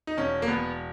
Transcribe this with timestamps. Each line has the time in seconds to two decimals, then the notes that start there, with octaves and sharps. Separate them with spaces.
0.07 D#4
0.17 E1 C#4
0.42 A#3
0.48 E1 B3